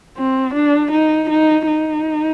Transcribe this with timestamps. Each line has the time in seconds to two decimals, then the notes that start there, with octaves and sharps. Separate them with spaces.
0.17 C4
0.54 D4
0.91 D#4
1.30 D#4
1.68 D#4